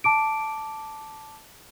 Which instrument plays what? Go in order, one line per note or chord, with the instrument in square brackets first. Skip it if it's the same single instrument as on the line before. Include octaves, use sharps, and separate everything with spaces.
[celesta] A5 D6 D7